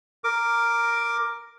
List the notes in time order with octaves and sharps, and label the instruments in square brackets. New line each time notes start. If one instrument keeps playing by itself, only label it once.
[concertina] A#4 D6